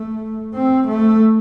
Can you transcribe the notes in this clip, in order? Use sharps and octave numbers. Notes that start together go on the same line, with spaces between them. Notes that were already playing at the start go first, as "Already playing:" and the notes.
Already playing: A3
C4
A3